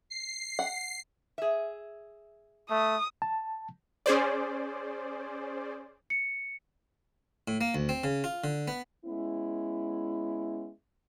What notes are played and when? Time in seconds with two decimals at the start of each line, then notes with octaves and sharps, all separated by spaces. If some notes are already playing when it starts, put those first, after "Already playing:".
0.10 C7
0.59 F#5
1.38 G#4 E5
2.70 A3 D#6
3.22 A5
4.06 C#4 G#4 C5 D5
6.10 C#7
7.48 A2
7.61 A#3
7.75 D2
7.89 C4
8.04 C#3
8.24 F4
8.44 D3
8.68 B3
9.05 G#3 B3 C#4 E4